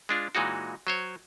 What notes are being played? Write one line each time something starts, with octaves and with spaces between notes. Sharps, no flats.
G#3 D4 F4
A#2 E3 G#3 D#4 F#4
F#3 C5 C#5